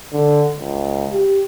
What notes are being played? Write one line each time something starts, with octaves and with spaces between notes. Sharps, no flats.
D3
C#2
G4